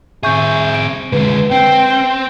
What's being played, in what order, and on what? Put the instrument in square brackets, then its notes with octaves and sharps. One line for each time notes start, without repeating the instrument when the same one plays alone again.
[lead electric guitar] C4 G#4 [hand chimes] E5 C#6 G6
[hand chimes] D7
[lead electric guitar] D3 G#3 [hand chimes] B4
[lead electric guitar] C4 [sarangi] G5
[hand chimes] G6